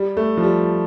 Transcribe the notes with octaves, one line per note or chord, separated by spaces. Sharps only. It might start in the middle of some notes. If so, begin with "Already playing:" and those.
Already playing: G3
A3
F3
G3